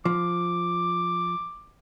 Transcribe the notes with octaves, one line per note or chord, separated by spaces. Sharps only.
F3 D6